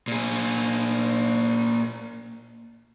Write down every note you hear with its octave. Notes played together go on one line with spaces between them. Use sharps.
A#2 G#4